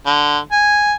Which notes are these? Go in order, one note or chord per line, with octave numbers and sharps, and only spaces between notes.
D3
G#5